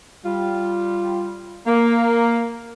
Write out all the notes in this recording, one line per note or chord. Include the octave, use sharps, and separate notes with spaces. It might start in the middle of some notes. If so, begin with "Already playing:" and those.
G3 F4
A#3